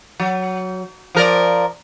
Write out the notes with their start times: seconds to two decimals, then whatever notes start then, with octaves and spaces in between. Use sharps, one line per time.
0.20 F#3
1.15 F3 A#4 D5